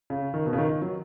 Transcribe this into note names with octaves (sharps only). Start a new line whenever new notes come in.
C#3
D#3
B2
C#3
D#3
D#3
F#3